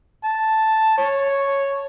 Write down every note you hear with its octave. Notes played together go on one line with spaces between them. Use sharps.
A5
C#5